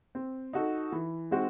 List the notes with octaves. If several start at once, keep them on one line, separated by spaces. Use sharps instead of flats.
C4
D#4 F#4 A4
E3
G#3 C4 D#4 F#4